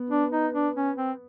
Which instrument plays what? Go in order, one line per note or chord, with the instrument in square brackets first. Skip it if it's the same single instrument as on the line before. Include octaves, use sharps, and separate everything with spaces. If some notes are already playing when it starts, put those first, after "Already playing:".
Already playing: [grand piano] B3
[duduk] D4
D#4
D4
C#4
C4